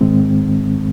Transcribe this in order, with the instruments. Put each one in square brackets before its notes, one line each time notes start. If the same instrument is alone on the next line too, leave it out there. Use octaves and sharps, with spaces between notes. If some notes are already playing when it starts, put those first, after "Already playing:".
[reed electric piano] G#2 D#3 G#3 C4